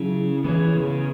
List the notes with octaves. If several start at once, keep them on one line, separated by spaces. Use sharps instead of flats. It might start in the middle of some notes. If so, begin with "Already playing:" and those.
Already playing: C#3 F#3 E4 C#5
E3 B3 G#4 C#5
C#3